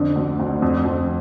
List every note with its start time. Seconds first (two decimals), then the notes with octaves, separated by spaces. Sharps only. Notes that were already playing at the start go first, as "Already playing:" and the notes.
Already playing: F2 D3
0.16 D2
0.40 D2
0.62 F2
0.85 F2